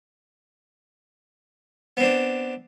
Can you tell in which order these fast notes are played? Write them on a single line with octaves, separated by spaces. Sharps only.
B3 C4 D4